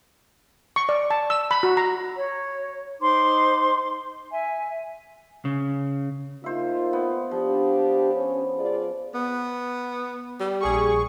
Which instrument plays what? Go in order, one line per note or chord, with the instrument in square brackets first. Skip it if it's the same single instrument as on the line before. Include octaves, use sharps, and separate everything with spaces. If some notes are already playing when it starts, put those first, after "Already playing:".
[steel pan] C#6
D5
A5
E6
B5
F#4
A#5
[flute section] C#5
D#4 C5 C6 D6
E5 G#5
[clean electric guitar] C#3
[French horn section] A#3 D#4 F4 [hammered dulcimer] C5 E5
[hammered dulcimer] B3
[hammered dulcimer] F3 [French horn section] D4 G4
[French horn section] C#4
F4 G#4 D5
[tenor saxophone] B3
G3
[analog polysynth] A#1 G#4 C#6